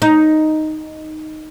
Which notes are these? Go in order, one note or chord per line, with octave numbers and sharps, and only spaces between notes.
D#4